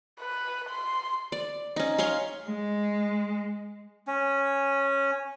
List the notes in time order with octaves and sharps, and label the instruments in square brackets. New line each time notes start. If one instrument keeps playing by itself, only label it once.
[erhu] B4
C6
[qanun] D5
C#4 D#4
C#4 C#5 F5 C6
[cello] G#3
[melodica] C#4